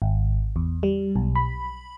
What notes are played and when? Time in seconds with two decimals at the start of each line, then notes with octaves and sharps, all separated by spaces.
0.02 G#1
0.56 E2
0.83 G3
1.16 B1
1.35 B5